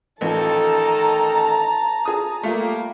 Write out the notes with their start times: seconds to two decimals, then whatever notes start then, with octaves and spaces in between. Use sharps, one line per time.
0.21 A1 D#3 F3 A4 A5 A#5
2.05 G#4 D#6
2.43 G3 A3 A#3 F4